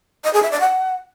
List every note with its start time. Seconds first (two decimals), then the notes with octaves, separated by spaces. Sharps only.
0.24 D#5
0.33 G#4
0.42 E5
0.51 D5
0.60 F#5